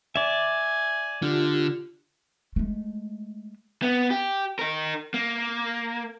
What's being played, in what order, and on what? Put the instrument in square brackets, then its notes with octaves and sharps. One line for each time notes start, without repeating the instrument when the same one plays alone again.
[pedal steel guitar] D5 E5 [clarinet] G#5
[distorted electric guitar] D3 [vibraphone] F4 G4
[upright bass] G#3 A3
[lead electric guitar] B3
G4
D#4 A#4
A#3